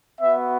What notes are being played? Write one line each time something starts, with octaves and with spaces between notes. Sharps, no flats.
B3 F#4 E5